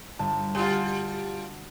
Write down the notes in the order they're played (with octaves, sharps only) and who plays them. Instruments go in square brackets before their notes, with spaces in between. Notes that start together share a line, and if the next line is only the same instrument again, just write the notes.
[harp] G1 [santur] A5
[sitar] G3 F4 [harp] F#4